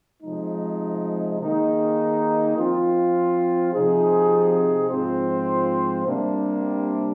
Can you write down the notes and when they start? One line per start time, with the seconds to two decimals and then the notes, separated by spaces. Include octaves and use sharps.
0.23 C3 F3 G#3 D#4
1.40 D#3 A#3 D#4 G#4
2.57 F3 C4 F4
3.73 C3 F3 C4 D#4 G#4
4.90 G#2 F3 C4 F4 C5
6.06 C3 G3 A#3 D4